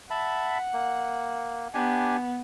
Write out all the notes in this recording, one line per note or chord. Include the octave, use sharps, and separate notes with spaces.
E5 F#5 A5 B5
A#3
B3 D4 G4 G#5